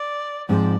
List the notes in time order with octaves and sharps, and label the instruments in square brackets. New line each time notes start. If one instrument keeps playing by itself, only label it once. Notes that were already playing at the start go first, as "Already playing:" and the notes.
Already playing: [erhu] D5
[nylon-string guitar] G#2 F3 C4 F4 G#4 [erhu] D5